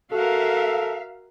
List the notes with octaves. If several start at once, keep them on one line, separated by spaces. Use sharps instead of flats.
F#4 A4 A#4 E5 F5